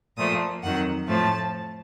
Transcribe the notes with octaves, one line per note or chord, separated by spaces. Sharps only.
A#2 F3 A3 D#6
F2 D#3 F#3 F#5
A2 F3 A3 A5